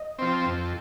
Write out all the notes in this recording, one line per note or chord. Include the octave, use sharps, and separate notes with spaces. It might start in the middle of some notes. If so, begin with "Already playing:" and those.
Already playing: D#5
F3 C4
F2